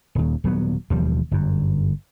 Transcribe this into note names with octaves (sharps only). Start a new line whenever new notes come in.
D#1 D#2
D#1 F#3 B3
E1 D#2 F3 G3
G1 F#2